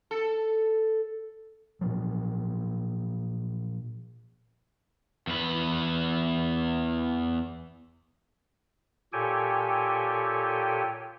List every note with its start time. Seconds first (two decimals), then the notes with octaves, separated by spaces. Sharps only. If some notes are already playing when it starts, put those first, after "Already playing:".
0.11 A4
1.81 A#2 F3 F#3
5.27 E2 B4
9.13 A#2 G4 A4 C#5 G5 G#5